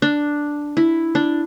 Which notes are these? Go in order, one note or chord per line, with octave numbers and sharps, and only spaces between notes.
D4
E4
D4